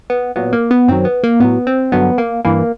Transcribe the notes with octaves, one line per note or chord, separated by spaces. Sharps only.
B3
A#2 F#3 B3
A#3
B3
F#2 D#3 F#3 C4
B3
A#3
A2 F#3 B3
C4
G2 D3 F#3 B3
A#3
G2 E3 A#3